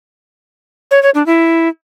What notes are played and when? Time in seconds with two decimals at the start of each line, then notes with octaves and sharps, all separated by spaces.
0.91 C#5
1.03 C#5
1.15 D4
1.26 E4